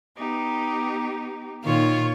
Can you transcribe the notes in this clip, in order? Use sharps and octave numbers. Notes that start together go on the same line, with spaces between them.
B3 D#4 G4
A#2 D#3 F4 C#5 C#6